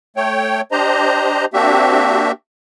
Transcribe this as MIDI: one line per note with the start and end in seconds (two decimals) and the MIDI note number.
0.16 0.61 57
0.16 0.61 73
0.16 0.61 79
0.72 1.45 62
0.72 1.45 67
0.72 1.45 72
0.72 1.45 75
0.72 1.45 82
1.54 2.32 58
1.54 2.32 60
1.54 2.32 62
1.54 2.32 66
1.54 2.32 67
1.54 2.32 76